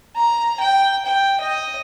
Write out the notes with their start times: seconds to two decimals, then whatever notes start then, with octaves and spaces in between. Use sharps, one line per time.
0.16 A#5
0.60 G5
1.05 G5
1.41 D#5